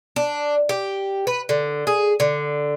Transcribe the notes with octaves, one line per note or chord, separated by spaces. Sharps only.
D4
G4
B4
D3
G#4
D3